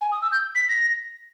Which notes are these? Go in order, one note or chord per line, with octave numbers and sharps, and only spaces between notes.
G#5
D#6
E6
G6
B6
A#6